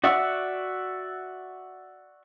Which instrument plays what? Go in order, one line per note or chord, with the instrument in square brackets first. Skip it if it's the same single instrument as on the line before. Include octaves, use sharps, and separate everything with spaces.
[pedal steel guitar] F#4 D5 E5 F#5 C#6